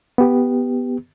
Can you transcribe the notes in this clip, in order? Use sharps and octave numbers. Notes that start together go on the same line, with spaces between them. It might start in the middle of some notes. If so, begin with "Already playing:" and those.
B3 G4